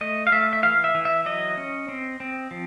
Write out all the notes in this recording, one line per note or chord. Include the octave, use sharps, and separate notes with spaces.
A3 D#5
F5
A3 E5
E5
E3 F5
E5
E3
E5
F#3 D#5
C#4
C4
C4
F3